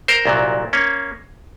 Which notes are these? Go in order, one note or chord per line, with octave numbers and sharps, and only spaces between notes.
A#4 C5
C2 A#2 F#3
A#3 C#4